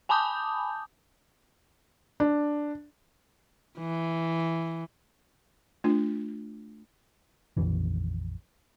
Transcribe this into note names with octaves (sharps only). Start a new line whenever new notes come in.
G#5 A5 B5 D6 D#6 G6
D4
E3
A3 D4 F4
A#1 F2 D#3 E3